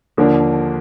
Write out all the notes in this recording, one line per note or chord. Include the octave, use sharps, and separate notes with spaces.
D#2 D3 F3 A#3 D4